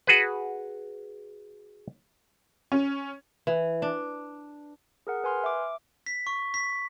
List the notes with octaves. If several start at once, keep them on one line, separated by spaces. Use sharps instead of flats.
F#4 G#4 B4
C#4
E3
D4
G#4 A#4 F#5
B4 G#5 C6 F6
E5 D6
B6
C#6
B6